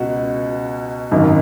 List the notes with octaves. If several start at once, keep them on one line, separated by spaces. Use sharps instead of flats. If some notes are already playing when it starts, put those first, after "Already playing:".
Already playing: C#2 B2 F#4
G#1 F#2 D#3